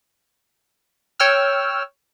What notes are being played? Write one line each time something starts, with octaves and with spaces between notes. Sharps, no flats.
C#5 G5 E6 F6